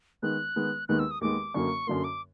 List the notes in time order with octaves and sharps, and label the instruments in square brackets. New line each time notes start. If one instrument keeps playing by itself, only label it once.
[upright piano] D#3 G#3 B3 [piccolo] F#6
[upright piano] D#3 G#3 B3
[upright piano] D#2 D#3 G#3 B3 [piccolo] F#6
[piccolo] E6
D#6
[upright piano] D#2 D#3 G#3 B3 [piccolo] D6
[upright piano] F#2 D3 F#3 A#3 [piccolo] C#6
[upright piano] F#2 D3 F#3 A#3 [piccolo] C6
[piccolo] D6